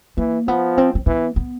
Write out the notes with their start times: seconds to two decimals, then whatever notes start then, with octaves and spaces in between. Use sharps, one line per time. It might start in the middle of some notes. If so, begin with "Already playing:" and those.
0.17 E3 A#3
0.48 F3 B3
0.77 C4
0.95 C4
1.06 E3 B3
1.36 B3